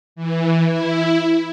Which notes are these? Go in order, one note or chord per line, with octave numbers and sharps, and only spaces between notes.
E3
E4